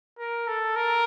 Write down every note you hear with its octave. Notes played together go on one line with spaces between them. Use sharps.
A#4
A4
A#4